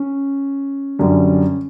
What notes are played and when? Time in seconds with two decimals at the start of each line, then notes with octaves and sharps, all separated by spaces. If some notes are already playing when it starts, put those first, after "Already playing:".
Already playing: C#4
0.99 F#2 D3 G3 C#4